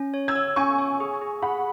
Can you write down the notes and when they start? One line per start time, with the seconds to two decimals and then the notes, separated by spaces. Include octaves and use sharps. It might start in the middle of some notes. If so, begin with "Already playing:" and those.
Already playing: C#4
0.14 C#5
0.28 E6 G#6
0.35 C#5
0.56 C#4 G#5 C#6
0.78 C#5
1.00 G#4
1.22 G#4
1.42 G#4 F#5 B5